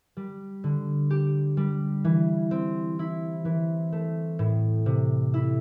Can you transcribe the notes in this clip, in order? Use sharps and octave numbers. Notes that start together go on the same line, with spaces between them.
G3
D3
G4
G3
E3
C4
E4
E3
A3
A2
C3
E4